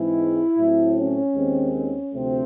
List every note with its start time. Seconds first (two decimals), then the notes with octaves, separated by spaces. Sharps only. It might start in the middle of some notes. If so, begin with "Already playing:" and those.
Already playing: G#2 E3 G#3 C4 E4
0.58 A2 F#3 A3 C4
0.97 C#4
1.35 D#2 D#3 G#3 C4
1.75 C#4
2.13 D2 C3 F3 A3 C4